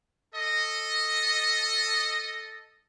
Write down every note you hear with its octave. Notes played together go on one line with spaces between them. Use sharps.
A4 D#5